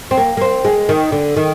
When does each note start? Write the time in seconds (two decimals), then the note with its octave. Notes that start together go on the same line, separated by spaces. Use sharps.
0.11 C4
0.17 A#3
0.37 A#3
0.41 C4
0.65 G#3
0.89 D#3
1.12 D3
1.36 D#3